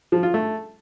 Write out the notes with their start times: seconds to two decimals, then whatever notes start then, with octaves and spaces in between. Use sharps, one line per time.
0.12 F3
0.23 F4
0.34 A3